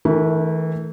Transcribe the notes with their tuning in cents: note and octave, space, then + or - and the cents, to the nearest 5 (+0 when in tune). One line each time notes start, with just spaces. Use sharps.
E3 -35 A3 +0 A#4 +0